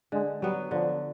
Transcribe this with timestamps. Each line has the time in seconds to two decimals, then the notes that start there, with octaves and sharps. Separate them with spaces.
0.12 D3 G#3
0.42 F#3 G3 B3
0.71 D3 F3